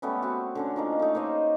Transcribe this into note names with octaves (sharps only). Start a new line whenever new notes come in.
G3 A3 B3 C#4
C4 F#4
D3 C#4 D4
F3 A#3 D#4
A3 D#4
A#3 C5 C#5 D#5